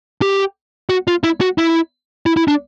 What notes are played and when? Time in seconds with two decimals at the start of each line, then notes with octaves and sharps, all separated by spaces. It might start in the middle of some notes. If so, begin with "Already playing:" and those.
0.22 G4
0.89 F#4
1.08 F4
1.24 E4
1.41 F#4
1.58 E4
2.26 E4
2.37 E4
2.48 D4